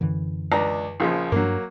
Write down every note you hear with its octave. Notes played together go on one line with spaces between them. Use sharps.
F#2 D3 E3
C#2 D4 A#5
A#1 C#3 F3
G2 F#3 A#3 C#4 D4